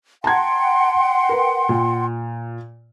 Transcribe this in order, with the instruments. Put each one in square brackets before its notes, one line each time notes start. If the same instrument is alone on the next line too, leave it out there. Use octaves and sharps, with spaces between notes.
[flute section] F#5 G5 C6 [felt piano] A5 A#5 G#6
[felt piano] A#4 B4
A#2